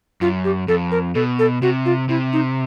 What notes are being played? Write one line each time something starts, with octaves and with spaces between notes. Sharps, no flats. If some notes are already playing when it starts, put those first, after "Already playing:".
F#2 F4
G4
F2 A4
A#4
B2 A4
A4
C3 F#4
F4
C3 E4
D#4